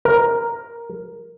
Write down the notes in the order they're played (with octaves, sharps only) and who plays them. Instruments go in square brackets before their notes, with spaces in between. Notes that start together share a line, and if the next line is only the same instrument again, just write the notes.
[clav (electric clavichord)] A#4